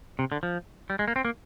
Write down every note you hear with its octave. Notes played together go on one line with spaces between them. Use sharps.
C3
D3
F3
G3
G#3
A#3
C4
A#3